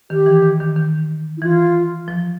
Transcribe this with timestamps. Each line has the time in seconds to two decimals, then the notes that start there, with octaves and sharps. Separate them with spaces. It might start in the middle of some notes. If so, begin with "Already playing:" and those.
0.10 D#3 G4
0.26 E3
0.42 D#3
0.60 D#3
0.76 D#3
1.37 E4
1.42 E3 F4
2.08 F3